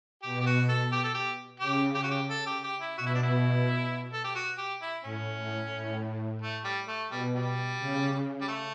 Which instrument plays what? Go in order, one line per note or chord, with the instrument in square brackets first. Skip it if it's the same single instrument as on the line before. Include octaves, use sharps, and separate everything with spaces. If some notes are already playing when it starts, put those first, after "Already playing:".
[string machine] B2 [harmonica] G4
[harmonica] G4
F#4
A4
G4
A4
G4
[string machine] C#3 [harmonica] G4
[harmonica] G4
F#4
G4
A4
G4
G4
E4
[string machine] B2 [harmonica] F#4
[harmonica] E4
D4
E4
A4
G4
F#4
G4
E4
[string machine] A2 [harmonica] C#4
[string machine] A2
A2
[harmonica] A3
G3
A3
[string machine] B2 [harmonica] G3
[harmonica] G3
[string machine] C#3
[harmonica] G3
A3